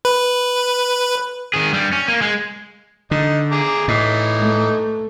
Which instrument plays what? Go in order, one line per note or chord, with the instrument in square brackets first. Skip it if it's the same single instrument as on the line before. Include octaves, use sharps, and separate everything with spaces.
[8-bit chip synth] B4
[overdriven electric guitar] D#3 G#4
G2 G3
C#4
A#3
G#3
[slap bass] D3 [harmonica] D#4
[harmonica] G#4 A#5 D6
[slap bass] A2 [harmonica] E3 D#4
[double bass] A3